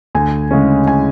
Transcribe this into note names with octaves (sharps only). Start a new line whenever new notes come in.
D2 G#5
C#3 G#3 C#4
G#5